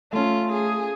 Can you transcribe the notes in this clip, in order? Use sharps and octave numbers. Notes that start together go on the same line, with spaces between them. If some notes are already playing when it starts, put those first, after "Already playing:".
A3 C#4 F4
G#4